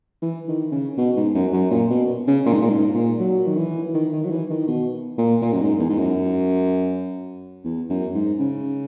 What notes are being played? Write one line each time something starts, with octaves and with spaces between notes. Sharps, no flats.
E3
D#3
C#3
B2
G#2
F#2
F#2
A#2
B2
C#3
A#2
G#2
A#2
G#2
A#2
F#3
D#3
E3
D#3
D#3
F#3
E3
D#3
B2
A#2
A#2
F#2
G#2
E2
G#2
F#2
E2
F#2
G#2
C#3